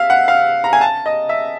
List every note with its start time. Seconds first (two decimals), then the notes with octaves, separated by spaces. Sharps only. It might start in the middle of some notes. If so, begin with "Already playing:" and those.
Already playing: E5 F5
0.10 F#5
0.28 F5
0.64 A#5
0.73 G#5
0.81 A5
1.06 D#5
1.29 E5